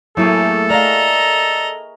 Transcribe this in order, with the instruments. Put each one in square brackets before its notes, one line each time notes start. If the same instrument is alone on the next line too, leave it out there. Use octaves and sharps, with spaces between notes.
[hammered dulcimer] A2 A3 G#4 [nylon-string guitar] F#3 E4 [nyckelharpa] A#3 [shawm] A4
[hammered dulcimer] A#4 [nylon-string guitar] D5 F5 [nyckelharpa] D#5 A#5